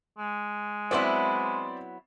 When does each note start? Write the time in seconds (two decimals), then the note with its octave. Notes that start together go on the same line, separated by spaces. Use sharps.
0.18 G#3
0.91 F#3 B3 C4 E4 D5 C6